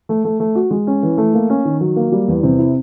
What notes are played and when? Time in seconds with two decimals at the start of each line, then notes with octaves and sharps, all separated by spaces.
0.09 A3
0.24 A3
0.40 A3
0.55 F#4
0.71 G#3
0.87 C#4
1.03 E3
1.18 A3
1.34 A#3
1.50 C#4
1.65 D#3
1.81 F#3
1.96 A#3
2.12 G3
2.28 E2
2.43 C3
2.59 E4